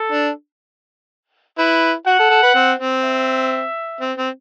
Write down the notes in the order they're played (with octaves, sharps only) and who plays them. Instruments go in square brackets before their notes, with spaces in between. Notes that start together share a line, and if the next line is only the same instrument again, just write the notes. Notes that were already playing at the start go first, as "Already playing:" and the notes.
Already playing: [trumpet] A4
[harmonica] D4
[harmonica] E4 [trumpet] B4
[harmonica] F#4 [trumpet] F#5
[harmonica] A4
A4
B4
C4
C4
[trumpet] E5
[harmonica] C4
C4